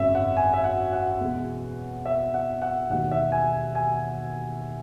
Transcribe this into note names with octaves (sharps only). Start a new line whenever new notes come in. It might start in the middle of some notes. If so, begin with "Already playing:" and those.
Already playing: G#1 F#2 C#3 G#3 E5
F#5
G#5
E5
F#5
F#5
E2 B2 G#3
E5
F#5
F#5
E1 D#2 D#3 G#3 F#5
E5
G#5
G#5